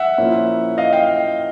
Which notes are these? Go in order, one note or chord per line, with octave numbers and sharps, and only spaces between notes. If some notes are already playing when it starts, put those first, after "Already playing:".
Already playing: E5 F#5
A#2 F3 A#3 C#4 E4
D#5 F5
F5 G5